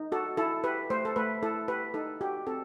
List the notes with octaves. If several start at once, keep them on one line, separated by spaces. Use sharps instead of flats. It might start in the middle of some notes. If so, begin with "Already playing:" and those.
Already playing: D#4
F#4 A4
E4 A4
G4 B4
A3 C5
A4
A3 B4
E4 A4
G4 B4
D#4 A4
F#4 G4
C4 A4